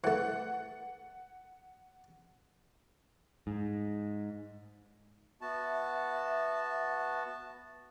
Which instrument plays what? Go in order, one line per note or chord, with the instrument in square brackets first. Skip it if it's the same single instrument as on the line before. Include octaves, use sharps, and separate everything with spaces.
[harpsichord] E3 A3 [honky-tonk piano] F#5
[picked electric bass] G#2
[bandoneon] B3 F#4 A5 [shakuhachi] E5